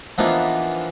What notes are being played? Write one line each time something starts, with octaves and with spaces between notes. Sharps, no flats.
E3 F3 A#3 B3 D4 D#4